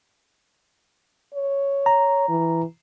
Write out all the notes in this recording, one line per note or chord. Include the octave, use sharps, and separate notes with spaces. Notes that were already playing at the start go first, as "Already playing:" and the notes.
C#5
A#5
E3